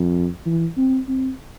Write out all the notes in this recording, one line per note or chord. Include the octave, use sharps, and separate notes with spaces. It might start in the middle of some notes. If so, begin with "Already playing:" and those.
Already playing: F2
E3
C4
C4